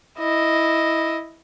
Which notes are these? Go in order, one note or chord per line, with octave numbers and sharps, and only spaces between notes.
E4 D#5